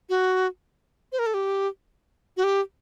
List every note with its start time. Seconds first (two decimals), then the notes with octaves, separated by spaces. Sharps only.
0.10 F#4
1.12 C5
1.19 A#4
1.26 A4
1.34 G4
2.37 F#4
2.44 G4